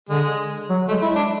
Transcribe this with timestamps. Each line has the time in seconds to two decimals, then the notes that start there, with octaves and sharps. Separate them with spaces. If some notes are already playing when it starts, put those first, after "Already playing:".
0.09 D3 G#3
0.70 F#3
0.89 G#3 A3
1.02 E4
1.16 D4